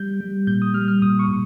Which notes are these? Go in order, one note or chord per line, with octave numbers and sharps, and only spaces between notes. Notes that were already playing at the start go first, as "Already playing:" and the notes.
Already playing: G3 G6
G3
A#2 G6
D#6
G3 F6
F6
A#2 D#6
C#6
A#2